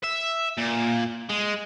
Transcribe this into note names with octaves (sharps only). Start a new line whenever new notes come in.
E5
A#2
G#3